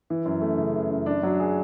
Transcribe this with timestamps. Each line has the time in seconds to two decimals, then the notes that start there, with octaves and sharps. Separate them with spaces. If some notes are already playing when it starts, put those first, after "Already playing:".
0.10 E3
0.26 F#2
0.42 A3
0.58 C#3
0.75 E3
0.90 F#2
1.06 D4
1.23 F#3
1.40 G#4